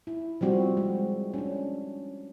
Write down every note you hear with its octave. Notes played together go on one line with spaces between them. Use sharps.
E4
F3 G3 C4 F#4
G#3
C#4 D4